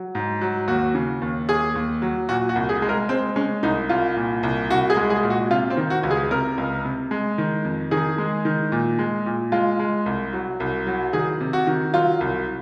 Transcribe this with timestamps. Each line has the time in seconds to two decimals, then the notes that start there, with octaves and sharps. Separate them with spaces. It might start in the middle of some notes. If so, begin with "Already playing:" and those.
Already playing: F#3
0.15 G#2
0.41 F#3
0.68 D#2 F#4
0.95 C#3
1.22 D#2
1.49 D#2 G#4
1.75 D#2
2.02 F#3
2.29 A#2 F#4
2.49 F#4
2.56 C2
2.69 G#4
2.82 G#3
2.89 A#4
3.09 G#3 C4
3.36 G#3 C#4
3.63 C2 D#4
3.89 C2 F4
4.17 A#2
4.43 C2
4.70 C2 F#4
4.90 G#4
4.97 G#3
5.10 G#4
5.23 A#2
5.30 F#4
5.50 C3 F4
5.70 C4
5.77 D#3
5.90 F#4
6.03 C#2
6.11 G#4
6.31 C3 A#4
6.58 C#2
6.85 C3
7.11 G#3
7.38 D#3
7.65 F2
7.91 D#3 G#4
8.18 G#3
8.45 D#3
8.72 A#2
8.99 G#3
9.26 A#2
9.52 G#3 F4
9.80 G#3
10.06 C2
10.33 F#3
10.60 C2
10.87 F#3
11.13 D#3 G#4
11.40 C3
11.53 F#4
11.67 D#3
11.94 F#3 F4
12.21 C2